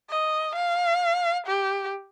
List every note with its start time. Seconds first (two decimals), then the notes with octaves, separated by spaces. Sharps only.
0.10 D#5
0.56 F5
1.47 G4